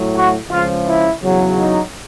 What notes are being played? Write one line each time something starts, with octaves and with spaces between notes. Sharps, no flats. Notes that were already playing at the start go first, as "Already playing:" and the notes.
Already playing: A2 F#3
F#4
C#2 C#3 F3 F4
E4
E2 C#3 F#3
D#4